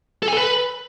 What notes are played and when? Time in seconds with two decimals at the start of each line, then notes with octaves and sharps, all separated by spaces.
0.23 A4
0.28 G#5
0.33 A4
0.38 B4